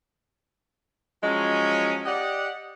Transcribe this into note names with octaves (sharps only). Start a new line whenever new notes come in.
F3 F#3 G#3 C#4
G4 D5 D#5 F#5